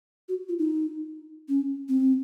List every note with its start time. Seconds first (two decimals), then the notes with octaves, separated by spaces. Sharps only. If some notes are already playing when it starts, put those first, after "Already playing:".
0.29 F#4
0.49 F4
0.59 D#4
1.49 C#4
1.89 C4